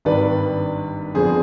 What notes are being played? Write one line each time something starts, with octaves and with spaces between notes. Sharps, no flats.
G#1 G2 D#3 G3 D4 B4 D5
F2 D3 F3 B3 D4 G#4 C5